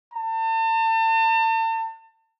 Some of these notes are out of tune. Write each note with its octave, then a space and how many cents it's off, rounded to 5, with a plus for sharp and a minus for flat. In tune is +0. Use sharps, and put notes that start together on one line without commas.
A5 +40